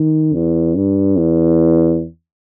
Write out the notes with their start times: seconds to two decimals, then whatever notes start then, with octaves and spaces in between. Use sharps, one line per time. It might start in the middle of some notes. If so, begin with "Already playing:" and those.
Already playing: D#3
0.34 E2
0.75 G2
1.17 E2